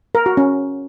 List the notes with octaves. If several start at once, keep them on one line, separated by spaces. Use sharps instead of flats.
A#4
F#4
C#4